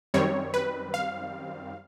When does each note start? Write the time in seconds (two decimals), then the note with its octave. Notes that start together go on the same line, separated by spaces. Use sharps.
0.14 F#2 D#3 G3 C4 C#5
0.54 B4
0.94 F5